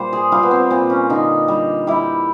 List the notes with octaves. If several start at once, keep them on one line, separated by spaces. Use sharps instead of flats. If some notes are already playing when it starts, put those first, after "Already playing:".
Already playing: A#2 G3 C5
G#4
G3 F4
B3
C4
A#2 C4
C#4
D3 D#4
G3
G3 E4